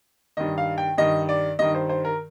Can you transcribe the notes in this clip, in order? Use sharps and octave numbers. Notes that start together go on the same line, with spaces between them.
G2 D#3 D#5
F5
G5
G2 D#3 D#5
D5
G2 D#3 D#5
C5
C5
A#4